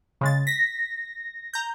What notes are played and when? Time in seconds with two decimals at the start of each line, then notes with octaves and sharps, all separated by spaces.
0.21 C#3 G#3 A6
0.47 A#6 B6
1.53 A#5 G6